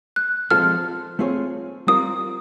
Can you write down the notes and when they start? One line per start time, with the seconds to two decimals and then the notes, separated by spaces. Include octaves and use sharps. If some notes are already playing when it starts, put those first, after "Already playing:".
0.16 F#6
0.51 F3 G#3 C4 F4 A4 F6
1.19 A3 C4 F4 G#4 C#5
1.87 G3 C4 F4 A#4 D5 D#6